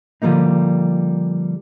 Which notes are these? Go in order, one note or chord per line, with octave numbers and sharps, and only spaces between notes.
D3 F3 G3 A#3 D#4